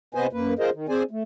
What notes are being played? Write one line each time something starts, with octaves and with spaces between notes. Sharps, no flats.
C3 B3 B4 C5 D#5 G#5
F#2 A#3 B4
F4 G#4 A#4 C5 D#5
D#3
C4 G#4 C5 D5 G#5
A3